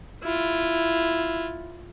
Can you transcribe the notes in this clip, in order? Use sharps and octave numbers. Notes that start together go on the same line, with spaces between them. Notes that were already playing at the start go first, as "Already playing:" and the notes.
E4 F4